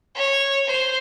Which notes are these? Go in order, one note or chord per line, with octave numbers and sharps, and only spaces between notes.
C#5
C5